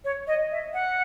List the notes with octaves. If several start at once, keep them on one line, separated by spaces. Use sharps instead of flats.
C#5
D#5
E5
F#5